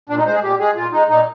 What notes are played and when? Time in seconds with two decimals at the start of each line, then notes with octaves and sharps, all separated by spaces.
0.09 A#2 D4
0.18 D#4
0.26 G#3 C5
0.34 G#4
0.43 A#2 G4
0.59 G#3 G#4
0.76 A#2 F4
0.92 G#3 D#4
1.09 A#2 D#4